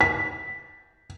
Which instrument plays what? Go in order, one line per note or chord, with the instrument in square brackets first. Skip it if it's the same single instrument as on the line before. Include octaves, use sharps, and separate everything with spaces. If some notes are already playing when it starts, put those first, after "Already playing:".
[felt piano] B6